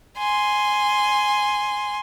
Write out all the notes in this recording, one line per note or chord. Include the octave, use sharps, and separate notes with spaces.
G#5 C6